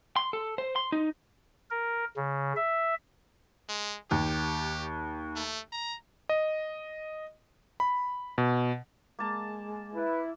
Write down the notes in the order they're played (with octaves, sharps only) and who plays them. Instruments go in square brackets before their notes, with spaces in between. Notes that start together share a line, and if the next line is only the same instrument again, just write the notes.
[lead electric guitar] C6
A4
C5
C6
D#4
[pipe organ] A#4
C#3
E5
[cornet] G#3
[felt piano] D#2 [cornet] G4
[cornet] A3
A#5
[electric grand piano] D#5
B5
B2
[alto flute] G#3 [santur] A#3 A5
[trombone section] E4 [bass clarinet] B4